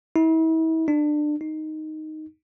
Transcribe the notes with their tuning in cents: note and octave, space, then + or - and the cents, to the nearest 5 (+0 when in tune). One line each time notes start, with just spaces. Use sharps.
E4 -40
D4 +25
D#4 +0